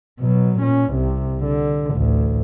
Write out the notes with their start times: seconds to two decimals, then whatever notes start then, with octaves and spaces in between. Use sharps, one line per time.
0.20 B2 F#3
0.59 A#2 C#4
0.92 C2 C3
1.45 D3
1.94 A1 D2